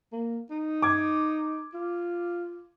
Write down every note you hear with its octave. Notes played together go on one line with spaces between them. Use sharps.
A#3
D#4
D6 G#6
F4